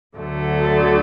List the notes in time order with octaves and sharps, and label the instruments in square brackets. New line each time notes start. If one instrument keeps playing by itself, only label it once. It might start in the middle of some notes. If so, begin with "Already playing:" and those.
[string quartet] D2 D3 F#3 A3